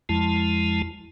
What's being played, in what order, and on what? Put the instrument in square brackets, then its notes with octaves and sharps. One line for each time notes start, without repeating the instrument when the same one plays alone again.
[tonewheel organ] F2 F3 G#3 E4 A5